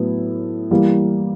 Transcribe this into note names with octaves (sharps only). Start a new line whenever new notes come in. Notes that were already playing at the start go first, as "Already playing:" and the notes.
Already playing: A2 F#3 B3 E4
E3 G3 A#3